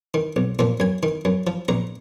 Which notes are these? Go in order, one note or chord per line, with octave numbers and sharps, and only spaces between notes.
D#3
B1
A#2 F3
F#2 G#5
D#3
F#2
F3
A#1 A#5